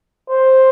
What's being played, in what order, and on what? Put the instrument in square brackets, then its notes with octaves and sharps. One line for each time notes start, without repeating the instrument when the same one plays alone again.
[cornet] C5